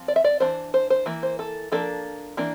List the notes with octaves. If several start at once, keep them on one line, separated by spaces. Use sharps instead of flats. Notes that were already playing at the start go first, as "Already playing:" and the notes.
Already playing: F3 C4
D5
E5
D5
E3 A#3 D4 C5
C5
C5
E3 A#3
C5
A4
F3 A#3 D4 A4
E3 A#3 D4